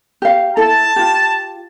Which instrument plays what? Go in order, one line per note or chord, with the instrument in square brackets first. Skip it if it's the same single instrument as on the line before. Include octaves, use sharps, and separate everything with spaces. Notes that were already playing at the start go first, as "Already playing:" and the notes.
[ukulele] G4 F5
[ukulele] E4 A4 [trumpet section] A5
[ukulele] F4 G4